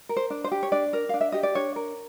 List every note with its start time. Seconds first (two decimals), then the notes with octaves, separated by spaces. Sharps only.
0.09 A#4
0.16 C5
0.30 D4
0.44 C5
0.51 G4
0.63 C#5
0.72 D4 D5
0.93 A#4
1.09 D4 F5
1.21 E5
1.32 G4 D#5
1.43 D5
1.55 D4 C#5
1.76 A#4